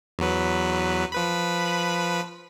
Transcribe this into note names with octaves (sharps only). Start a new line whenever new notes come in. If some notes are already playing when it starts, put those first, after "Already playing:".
E2 F#3 B4
F3 B4 B5